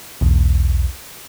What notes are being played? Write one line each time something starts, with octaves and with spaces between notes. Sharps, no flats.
B1 E2